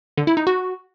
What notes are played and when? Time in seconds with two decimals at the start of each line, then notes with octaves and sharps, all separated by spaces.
0.17 D3
0.27 E4
0.37 D#4
0.47 F#4